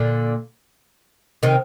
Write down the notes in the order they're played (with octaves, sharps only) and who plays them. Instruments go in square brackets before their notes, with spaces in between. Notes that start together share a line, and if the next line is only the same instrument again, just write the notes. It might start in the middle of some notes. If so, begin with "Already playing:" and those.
Already playing: [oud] A#2 D3
C3 D#3